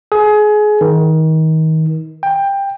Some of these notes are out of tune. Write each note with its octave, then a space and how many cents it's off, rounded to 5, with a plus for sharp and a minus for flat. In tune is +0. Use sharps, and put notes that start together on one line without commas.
G#4 +25
D#3 +30
G5 +15